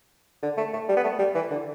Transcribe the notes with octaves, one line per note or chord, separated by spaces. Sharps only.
D3
A3
A3
G3
B3
A3
G3
E3
D3